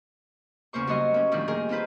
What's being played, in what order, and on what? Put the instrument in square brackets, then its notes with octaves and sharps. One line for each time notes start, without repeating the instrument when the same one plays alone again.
[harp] E2 C#3 A#3 C5 C#6
F#3 G3 F#4 D#5 C6
A#3 C#4
A2 D3 D#3 F3 G3
D#4 G#4 A#4
C4 D#4 F4 B4 C5